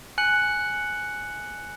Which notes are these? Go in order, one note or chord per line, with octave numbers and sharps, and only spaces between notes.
G#5 F#6 C#7 F#7